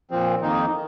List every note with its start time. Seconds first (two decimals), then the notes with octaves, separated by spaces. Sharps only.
0.11 A#2 F3 C4
0.41 F2 D#3 A#3 D#4
0.72 D#3